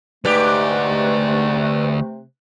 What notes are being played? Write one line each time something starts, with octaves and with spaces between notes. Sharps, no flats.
D2 G#2 C3 A3 G4 B4 D5 F#6